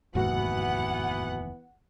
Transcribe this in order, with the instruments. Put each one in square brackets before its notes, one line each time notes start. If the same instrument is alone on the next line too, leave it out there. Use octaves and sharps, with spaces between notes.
[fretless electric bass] F1 D#2 [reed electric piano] G#2 F#4 [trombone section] E3 B3 [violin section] F#5